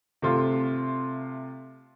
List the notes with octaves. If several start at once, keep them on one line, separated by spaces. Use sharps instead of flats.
C3 A3 F4